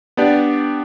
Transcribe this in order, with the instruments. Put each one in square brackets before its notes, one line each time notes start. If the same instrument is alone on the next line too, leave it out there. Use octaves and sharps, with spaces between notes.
[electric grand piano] B3 D4 G4 D5